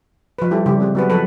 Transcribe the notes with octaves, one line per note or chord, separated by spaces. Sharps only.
F3 B4
G3 E4 G4 A4
C#3 G3 G4
G#3 C4
F#3 B3 F#4 G#4 B4
F3 F#3 A4 B4